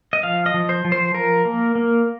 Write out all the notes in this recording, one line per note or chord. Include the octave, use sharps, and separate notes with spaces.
D#5
F3 F5
D#5
F3
C5
F3
C5
F3 A#4
A#3
A#3